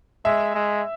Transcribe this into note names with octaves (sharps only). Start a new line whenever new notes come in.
G#3 E5
G#3